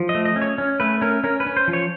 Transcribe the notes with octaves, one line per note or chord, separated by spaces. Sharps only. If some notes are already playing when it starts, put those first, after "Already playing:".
Already playing: F3
D#5
A3
D#5
C#4
C#5
C#4
A3 B4
C#4 A#4
C#4 A#4
B4
C#4
C5
F3
C#5